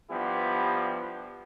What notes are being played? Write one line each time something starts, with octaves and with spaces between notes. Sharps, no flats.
G2 F3 B3 E4 G4